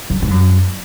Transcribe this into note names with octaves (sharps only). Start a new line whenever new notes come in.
F#2
G#2
F#2